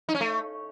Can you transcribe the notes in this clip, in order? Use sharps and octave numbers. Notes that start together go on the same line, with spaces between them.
D#4
C#4
A3